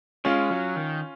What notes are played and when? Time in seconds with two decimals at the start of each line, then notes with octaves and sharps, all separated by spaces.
0.25 G#3 C#4 F4
0.51 F#3
0.76 D#3